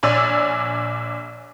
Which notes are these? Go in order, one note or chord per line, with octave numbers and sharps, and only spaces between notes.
A#1 C#5 D5 G#5 E6